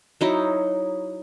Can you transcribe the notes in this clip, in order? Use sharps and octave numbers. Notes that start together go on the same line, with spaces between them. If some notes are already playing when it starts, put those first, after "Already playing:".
F#3 D#4 E4